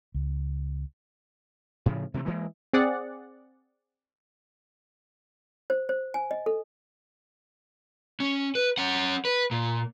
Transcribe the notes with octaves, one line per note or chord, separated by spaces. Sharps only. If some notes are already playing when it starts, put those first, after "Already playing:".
C#2
A2 C#3 F3
C3 E3 G#3 A3
E3 G#3 A#3
C4 G#4 D5 F#5
C5
C5
G#5
D#5
A4
C#4
B4
C#4 F#5
B4
A#2